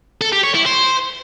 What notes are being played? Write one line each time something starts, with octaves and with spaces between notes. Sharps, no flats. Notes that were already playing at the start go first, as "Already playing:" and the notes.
A4
G4
C#5
E4
C5